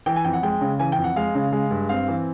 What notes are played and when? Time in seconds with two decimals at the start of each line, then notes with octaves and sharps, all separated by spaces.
0.06 E3 G5
0.16 G#5
0.25 F2 G5
0.33 F#5
0.43 G#3 G5
0.61 C#3
0.80 E3 G#5
0.92 G5
0.98 F2
1.04 F#5
1.16 G#3 F5
1.35 C#3
1.52 G#3
1.71 G2
1.89 C4 F5
2.08 E3